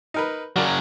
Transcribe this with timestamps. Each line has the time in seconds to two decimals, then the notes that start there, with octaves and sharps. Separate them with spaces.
0.14 D#4 A#4 B4
0.56 C#3 F#3 F#4 A#4 D5